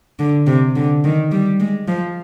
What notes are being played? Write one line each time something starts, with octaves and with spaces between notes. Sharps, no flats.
D3
C3
D3
D#3
G3
G#3
F3